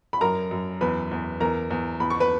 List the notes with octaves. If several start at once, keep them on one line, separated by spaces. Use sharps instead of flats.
B5
F#2 A#4 A#5
F#2
E2 B4 B5
E2
E2 A#4 A#5
E2
E2 B5
C#6
B4 B5